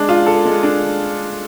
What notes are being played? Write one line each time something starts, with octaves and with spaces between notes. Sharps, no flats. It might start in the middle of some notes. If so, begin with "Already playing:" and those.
Already playing: G#3 D4
F4
A4
G#3
D4